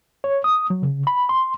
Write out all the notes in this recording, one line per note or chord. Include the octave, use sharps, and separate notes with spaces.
C#5
D#6
F#3
C#3
B5
C6